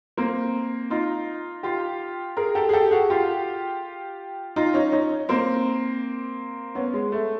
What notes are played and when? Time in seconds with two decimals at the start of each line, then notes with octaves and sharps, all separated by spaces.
0.17 A#3 C4
0.90 D#4 F4
1.63 F4 G4
2.37 G#4 A#4
2.55 G4 A4
2.69 G#4
2.73 G4 A4
2.91 F#4 G#4
3.10 F4 G4
4.56 D#4 F4
4.74 C#4 D#4
4.92 C#4 D#4
5.29 A#3 C4
6.75 B3 C#4
6.93 G#3
7.12 A3